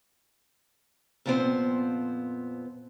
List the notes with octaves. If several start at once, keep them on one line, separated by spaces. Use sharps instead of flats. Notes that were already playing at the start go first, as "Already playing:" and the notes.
F2 A#2 F3 B3 C4 C5